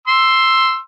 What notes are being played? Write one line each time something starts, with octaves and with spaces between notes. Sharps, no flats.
C6 E6